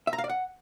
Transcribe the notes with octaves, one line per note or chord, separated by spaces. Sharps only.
E5
A#5
F5
D5
F#5